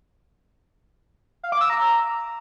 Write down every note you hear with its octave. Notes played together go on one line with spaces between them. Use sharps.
F5
D6
E6
A#5